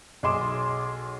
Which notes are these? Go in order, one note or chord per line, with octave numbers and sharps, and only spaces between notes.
B1 G#4 D#5 C6 D6 E7